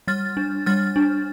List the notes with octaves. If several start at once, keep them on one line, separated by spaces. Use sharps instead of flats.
G3 F6 A6
D4
G3 F6 A6
D4